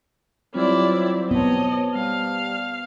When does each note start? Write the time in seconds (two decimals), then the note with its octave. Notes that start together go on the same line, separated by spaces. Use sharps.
0.54 F#3 G3 C4 E4 F4 C#5 D5
1.31 B3 C5 C#5 D#5 A5
1.95 G3 F5